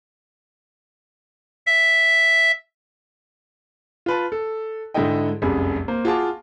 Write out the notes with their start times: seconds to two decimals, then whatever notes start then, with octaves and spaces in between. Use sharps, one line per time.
1.67 E5
4.06 F4 B4 A5
4.32 A4
4.94 G#2 D3 E4 A4 D#5 G5
5.42 F1 C2 F#2 G#4 B5
5.88 A#3 C5
6.05 F4 F#4 G#4 F5 A5 D6